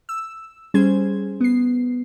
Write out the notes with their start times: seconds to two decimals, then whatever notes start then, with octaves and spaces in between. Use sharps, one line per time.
0.09 E6
0.74 G3 C#4 G#4 C5 G#6
1.41 B3 C7